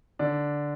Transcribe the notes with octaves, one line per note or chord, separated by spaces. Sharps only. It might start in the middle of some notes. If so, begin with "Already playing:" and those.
D3 D4